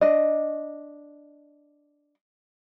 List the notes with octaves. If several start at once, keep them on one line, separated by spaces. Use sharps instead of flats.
D4 D#5